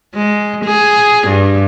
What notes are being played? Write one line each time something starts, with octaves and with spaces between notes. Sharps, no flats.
G#3
G#4
G2